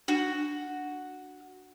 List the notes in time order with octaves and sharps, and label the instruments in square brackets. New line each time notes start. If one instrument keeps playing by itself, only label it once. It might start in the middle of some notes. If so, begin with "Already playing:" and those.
[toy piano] D4 [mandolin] F#4